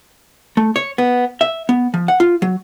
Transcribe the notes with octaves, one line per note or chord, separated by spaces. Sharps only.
A3
C#5
B3
E5
B3
F3
F#5
F4
F#3